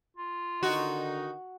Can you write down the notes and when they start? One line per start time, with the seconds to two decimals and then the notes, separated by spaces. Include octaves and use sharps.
0.17 F4
0.63 D3 D#3 D#4 F#4